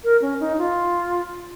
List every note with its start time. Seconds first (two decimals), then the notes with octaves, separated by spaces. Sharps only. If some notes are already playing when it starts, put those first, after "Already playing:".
0.04 A#4
0.22 C#4
0.40 D#4
0.58 F4